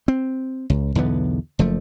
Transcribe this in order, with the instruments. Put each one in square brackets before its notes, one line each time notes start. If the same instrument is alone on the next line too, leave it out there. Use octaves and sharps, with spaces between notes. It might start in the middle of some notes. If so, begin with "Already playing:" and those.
[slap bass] C4
C#2
B1 E2 D3 B3
F#1 F3 A3